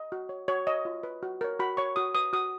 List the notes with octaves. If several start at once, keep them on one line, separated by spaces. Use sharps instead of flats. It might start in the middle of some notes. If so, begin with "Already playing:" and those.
Already playing: D#5
F#4
C#5
F#4 C#5
C#5 D#5
F4
B4
F#4
A#4 C#5
F#4 B5
C#5 C#6
F#4 D#6
B4 D#6
F#4 D#6